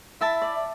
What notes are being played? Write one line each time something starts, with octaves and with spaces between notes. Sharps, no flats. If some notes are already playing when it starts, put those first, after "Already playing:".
E4 E5 A5
D5